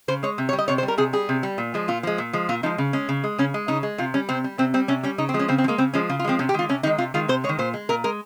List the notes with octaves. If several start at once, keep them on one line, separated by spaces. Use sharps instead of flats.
C#3 C5
G#3 C#5
C3
C#5
G3
D#5
C3 C#5
C5
G3
A#4
C3 G#4
G3 G#4
C3
G3
A#2
F3 G#3
A#2 F4
F3 G#3
A#2
F3 G#3
A#2 F4
F3 G#3 D#4
C#3
G#3 C#4
C#3
G#3
C#3 C#4
G#3
C#3 D#4
G#3
C3 F4
G3 C#4
C3 C4
G3
C3 C4
G3 C4
C3 C#4
G3 C#4
C#3 D#4
C4
F3 G#3
C#4
C#3 C4
C4
F3
G#3 A#3
C#3 C4
F3 G#3 C#4
C#3 F4
F4
F3 G#3 C4
C3 C#4
G4
D#3 G#3 F4
C3 C#4
D#3 G#3 D#4
C3 F4
D#3 G#3 F4
C3 C5
G#3 C#5
D#3
A#2 C5
G#3
A#2 A#4
G#3 A#4